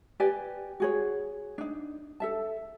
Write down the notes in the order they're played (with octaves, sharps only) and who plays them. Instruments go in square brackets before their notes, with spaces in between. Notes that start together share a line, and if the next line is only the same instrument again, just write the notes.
[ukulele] G4 B4 D5 G#5
F#4 G#4 C#5
D4 D#4
A4 E5 A5